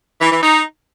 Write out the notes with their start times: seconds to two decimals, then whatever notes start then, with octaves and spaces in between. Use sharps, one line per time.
0.21 E3
0.32 E3
0.43 D#4